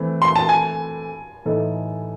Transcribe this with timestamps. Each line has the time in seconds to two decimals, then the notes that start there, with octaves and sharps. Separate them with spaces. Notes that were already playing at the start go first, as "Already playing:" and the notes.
Already playing: E3 A3 C4
0.22 C6
0.36 A5
0.49 G#5
1.45 A2 E3 A3 D#4 A4